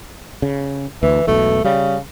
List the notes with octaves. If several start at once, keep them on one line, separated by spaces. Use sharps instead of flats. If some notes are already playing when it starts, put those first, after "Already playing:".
C#3
D2 E3
E1 B1 B2 A3
C#3 G3